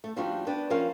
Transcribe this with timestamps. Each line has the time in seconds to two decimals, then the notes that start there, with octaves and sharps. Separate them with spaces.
0.04 A3
0.16 F3 G3 D4 D#4 F4 F#4
0.47 B3 D4 B4 G5
0.70 F3 C#4 A#4 C5 F5